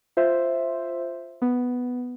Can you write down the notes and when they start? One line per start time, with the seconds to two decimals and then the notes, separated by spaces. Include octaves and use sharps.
0.17 F4 C5 E5
1.42 B3